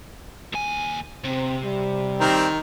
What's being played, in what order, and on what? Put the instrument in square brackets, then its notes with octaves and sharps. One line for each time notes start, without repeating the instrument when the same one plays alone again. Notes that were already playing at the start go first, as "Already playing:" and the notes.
[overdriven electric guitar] D#2 G#5
[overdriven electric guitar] C3 [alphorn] C4
[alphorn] G3
[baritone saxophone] D#3 [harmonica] C4 G4 A#4